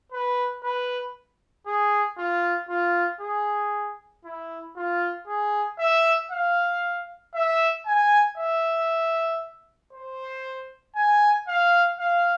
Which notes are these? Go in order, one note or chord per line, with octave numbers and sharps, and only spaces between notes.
B4
B4
G#4
F4
F4
G#4
E4
F4
G#4
E5
F5
E5
G#5
E5
C5
G#5
F5
F5